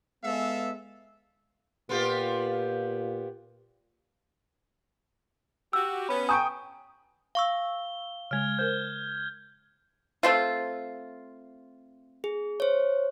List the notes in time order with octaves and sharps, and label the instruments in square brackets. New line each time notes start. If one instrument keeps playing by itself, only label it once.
[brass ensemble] G#3 B3 [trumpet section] A4 E5 F5
[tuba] A#2 [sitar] B3 F4 G4
[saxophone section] F#4 G4 [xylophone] E6
[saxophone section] B3 C#4 [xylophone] B5
[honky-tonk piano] G5 C#6 D#6 [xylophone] G#5 A#5 G6
[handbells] F5 C#6 E6 [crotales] G7
[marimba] C#3 G#3 [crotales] F6 G#6
[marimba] A#4 C5 [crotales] G6
[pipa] A3 C4 F4
[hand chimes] G#4
C5 C#5